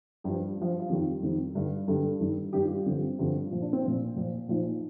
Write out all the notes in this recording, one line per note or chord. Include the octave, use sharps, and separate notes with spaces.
G2 F3 G4
G2 F3
F4
F2 D#3 G3 G4
F2 D#3 G3
G2 D3 G3
G2 D3 G3 A4
G2 D#3 G3
G2 D#3 G3 G4
F4
F4
G2 D3 F3 C4
G2 D3 F3
A#2 F3
D4
C4
A#2 F3
A#2 F3
A#2 F3 D#4